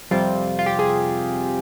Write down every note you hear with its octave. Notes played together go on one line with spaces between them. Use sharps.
F2 C3 G3 C4 F4
F4
G4
G#4